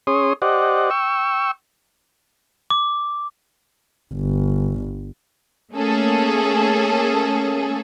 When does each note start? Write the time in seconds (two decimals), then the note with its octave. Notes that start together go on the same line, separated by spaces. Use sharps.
0.07 C#4 G#4 C#5 C6 D#6
0.42 G4 C5 D5 D#5 F#5
0.90 G5 C#6 E6
2.70 D6
4.14 G1
5.73 A3 A#3 C#4 G#4 A4